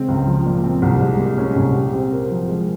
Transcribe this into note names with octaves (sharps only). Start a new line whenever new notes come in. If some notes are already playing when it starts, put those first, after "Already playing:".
Already playing: C#3 G#3 C4
C#2
F3
A#2
C4
C2
G#3
A#2
C#4
C2
G4
C4
A#4
F3
G#3